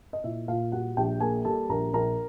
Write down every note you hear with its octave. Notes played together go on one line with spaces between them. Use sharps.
D#5
A#2 E4 E5
A#2 F4 F5
G3 F#4 F#5
A#1 G4 G5
A#3 G#4 G#5
G3 A4 A5
A#1 A#4 A#5
A#1 A#4 A#5